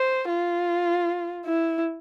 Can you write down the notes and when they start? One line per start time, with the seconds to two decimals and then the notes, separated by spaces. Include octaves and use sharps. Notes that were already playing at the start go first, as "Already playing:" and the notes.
Already playing: C5
0.29 F4
1.46 E4